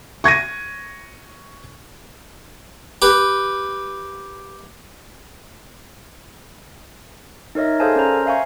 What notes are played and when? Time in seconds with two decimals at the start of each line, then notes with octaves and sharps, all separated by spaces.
0.24 C#6 G#6 A#6 D#7
3.02 G4 B4
7.55 D#4 A#4 C#5 D#5 E5
7.80 G#4 A4 C5 F5 G#5 A5
7.96 C#4 A#4 C5 D5 A#5
8.26 E5 F5 G#5 C#6